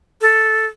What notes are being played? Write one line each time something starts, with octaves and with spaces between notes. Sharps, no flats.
A4